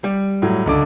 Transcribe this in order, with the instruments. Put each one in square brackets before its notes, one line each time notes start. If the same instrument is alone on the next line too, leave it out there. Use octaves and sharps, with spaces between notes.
[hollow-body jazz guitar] G3
[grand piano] A2 F#3
C#2 D3 D6